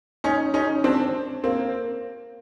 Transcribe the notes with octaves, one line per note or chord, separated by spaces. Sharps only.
C#4 D#4
C#4 D#4
C4 D4
A#3 C4